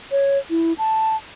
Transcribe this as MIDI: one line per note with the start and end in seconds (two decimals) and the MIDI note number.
0.11 0.38 73
0.50 0.73 64
0.78 1.16 81